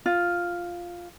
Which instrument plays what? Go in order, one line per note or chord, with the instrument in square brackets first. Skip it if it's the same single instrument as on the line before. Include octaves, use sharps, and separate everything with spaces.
[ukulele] F4